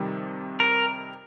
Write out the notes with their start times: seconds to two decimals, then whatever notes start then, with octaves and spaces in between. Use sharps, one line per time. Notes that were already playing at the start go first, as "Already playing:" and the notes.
Already playing: F2 C3 D#3 G3
0.60 A#4